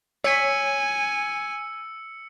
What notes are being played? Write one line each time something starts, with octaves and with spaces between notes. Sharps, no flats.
C#5 G#5 E6 B6 C#7